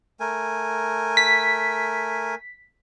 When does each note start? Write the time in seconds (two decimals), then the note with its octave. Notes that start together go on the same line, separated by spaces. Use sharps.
0.20 A3 A#4 G#5
1.17 B6